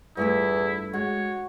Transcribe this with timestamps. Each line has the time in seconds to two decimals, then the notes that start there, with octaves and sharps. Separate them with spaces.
0.17 E2 G2 A3 E4 F4
0.93 G#3 F#4 C#5